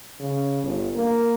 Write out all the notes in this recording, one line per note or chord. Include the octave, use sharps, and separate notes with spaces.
C#3
G1
A#3